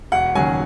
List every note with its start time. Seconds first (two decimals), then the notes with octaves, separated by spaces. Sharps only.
0.12 E1 F#5
0.35 D#2 C#3 F#3 G#5